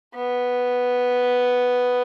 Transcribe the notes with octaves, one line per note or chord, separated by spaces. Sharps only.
B3